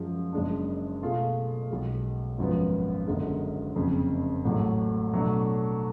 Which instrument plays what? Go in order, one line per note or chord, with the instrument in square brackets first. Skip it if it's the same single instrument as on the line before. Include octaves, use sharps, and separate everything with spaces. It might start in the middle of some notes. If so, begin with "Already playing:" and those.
Already playing: [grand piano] F#2 F3 G#3
F#1 F#2 C#3 G#3 D4
B2 A3 F4 G#4
B1 B2 G#3
G#1 F#2 F3 B3
F#1 F#2 D3 G#3
F#1 F2 C#3
A1 A2 F#3 A3
B2 F#3 A3 D4